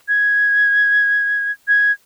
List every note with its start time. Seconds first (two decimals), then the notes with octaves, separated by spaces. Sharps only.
0.08 G#6
1.68 G#6